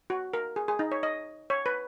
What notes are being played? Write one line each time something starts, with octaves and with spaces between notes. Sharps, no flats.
F#4
A#4
G#4
G#4
D#4
C#5
D#5
C#5
B4